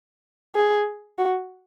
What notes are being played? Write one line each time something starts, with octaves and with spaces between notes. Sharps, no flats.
G#4
F#4